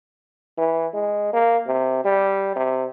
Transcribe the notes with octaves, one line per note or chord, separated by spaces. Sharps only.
E3
G#3
A#3
C3
G3
C3